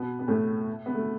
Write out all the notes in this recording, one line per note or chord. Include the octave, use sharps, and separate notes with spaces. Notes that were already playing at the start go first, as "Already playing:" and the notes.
Already playing: B2 B3
B3
A2 A3
B3
A3